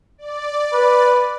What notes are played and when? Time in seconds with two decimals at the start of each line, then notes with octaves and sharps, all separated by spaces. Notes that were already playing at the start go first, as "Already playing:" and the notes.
0.18 D5
0.73 B4